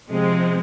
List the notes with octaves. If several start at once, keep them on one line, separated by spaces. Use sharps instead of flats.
C3 F3 G#3 C4